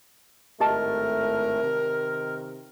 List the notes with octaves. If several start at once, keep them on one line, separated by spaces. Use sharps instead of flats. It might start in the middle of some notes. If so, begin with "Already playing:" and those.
G#1 A2 A3 G4 A#4 D#5 A5
C3 D#3